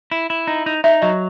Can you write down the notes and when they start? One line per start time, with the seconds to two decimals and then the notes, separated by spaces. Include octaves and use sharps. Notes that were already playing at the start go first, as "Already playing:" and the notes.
0.11 E4
0.30 E4
0.47 D#4
0.66 D#4
0.84 D#4 E5
1.02 F#3 D#5